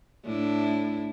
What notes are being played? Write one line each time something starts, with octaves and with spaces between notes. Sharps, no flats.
A2 D4 E4